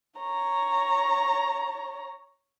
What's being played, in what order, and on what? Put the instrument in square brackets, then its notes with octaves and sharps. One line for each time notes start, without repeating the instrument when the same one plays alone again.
[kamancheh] C#5 A#5